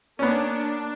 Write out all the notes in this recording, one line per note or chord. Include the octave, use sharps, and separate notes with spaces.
A#3 B3 C#4 D4